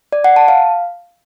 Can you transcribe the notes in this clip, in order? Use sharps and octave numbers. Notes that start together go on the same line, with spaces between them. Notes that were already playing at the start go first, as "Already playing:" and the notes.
D5
F#5
A5
F5